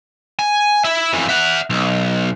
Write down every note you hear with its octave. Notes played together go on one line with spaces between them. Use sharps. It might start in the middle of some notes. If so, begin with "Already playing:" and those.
G#5
E4 E5
F2 E3
E5 F#5
B1